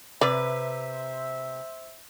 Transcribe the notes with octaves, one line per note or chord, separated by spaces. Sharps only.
C3 B4 C5 D5 E5